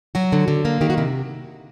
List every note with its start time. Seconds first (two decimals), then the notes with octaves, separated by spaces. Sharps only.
0.15 F#3 F#4
0.32 D3
0.48 D3
0.65 A#3
0.81 D#3 G4
0.90 F#4
0.98 C3 E4